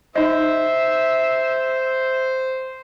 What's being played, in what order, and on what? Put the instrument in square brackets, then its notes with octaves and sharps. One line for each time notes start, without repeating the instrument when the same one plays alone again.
[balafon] D#4 D#5 [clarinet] C5 [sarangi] E5